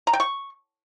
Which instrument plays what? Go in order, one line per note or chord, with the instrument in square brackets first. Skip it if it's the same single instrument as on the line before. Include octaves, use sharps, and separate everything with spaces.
[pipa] A#5
G5
C#6